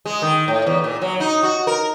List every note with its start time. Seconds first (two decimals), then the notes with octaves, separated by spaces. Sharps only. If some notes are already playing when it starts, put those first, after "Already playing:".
0.06 G#3
0.22 D#3
0.48 A2
0.67 E2
0.84 A#2
1.02 F#3
1.20 D#4
1.43 F#4
1.67 A#4